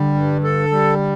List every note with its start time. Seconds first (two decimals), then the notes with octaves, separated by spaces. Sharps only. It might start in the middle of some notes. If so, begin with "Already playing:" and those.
Already playing: D3 G3
0.14 G2
0.44 A4
0.71 G3